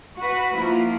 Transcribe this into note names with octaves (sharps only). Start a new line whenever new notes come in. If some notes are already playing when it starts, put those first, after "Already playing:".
F#4 B4
F3 A#3 E4 F4